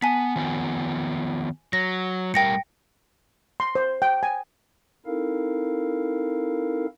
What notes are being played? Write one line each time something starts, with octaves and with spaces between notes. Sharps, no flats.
B3 G#5 A5 B6
D#3 F3 B3
F#3 A#6
A2 G3 A#4 G5 A#6 C#7
C6
C5
G5
G#5
C4 D#4 E4 A4 A#4 F5